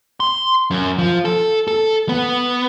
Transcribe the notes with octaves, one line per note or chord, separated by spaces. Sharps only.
C6
F#2
F3
A4
A4
B3